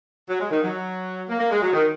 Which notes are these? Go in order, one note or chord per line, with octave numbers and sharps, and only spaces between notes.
F#3
G#3
D#3
F#3
A#3
A#3
G#3
F#3
D#3